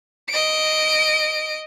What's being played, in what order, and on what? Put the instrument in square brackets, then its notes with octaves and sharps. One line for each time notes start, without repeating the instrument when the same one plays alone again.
[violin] D#5 D7